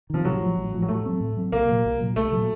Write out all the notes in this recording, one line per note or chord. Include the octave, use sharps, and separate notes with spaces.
C3 D#3 F3
A1 F#3
A2 F3
A1
A2 F3
F#3
A2 A3
F#3 C4
A2
F#3 C4
C2 A#3
A#2 F#3
C2
A#2 F#3
C2 A3
A#2 F#3